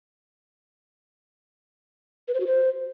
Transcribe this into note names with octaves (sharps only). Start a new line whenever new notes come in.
B4
C5
F#4
C5